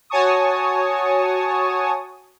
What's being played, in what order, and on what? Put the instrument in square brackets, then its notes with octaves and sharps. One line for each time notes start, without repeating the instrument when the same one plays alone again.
[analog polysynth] F#4 C#5 G#5 A5 C#6 D#6